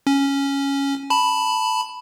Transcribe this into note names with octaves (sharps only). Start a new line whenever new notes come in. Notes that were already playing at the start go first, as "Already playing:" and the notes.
C#4
A5 B5